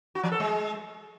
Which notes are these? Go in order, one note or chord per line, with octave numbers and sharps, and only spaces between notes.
F#4
F3
A4
G#3